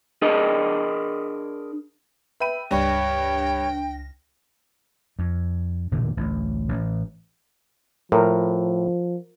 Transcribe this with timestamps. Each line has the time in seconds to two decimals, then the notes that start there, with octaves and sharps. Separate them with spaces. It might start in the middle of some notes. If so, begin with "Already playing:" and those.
0.22 D4 G#4 A#4 D#5
2.40 B4 E5 G5 B5 D#7
2.71 C#2 G2 D4 C#5 G5 A#6
5.19 F2
5.92 E1 A#2 D3 D#3
6.17 A1 D2
6.69 A1
8.12 A2 F3 A#4